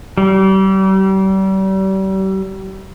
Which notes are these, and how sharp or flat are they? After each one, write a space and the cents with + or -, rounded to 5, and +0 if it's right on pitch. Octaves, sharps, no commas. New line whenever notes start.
G3 -35